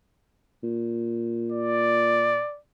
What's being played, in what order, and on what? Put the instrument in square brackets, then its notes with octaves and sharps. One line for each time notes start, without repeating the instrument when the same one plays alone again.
[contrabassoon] A#2
[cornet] D5